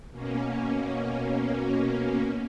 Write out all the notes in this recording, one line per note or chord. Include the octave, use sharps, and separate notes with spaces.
B2 A#3 C#4